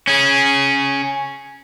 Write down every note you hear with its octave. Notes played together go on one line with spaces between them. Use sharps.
C#4 G#4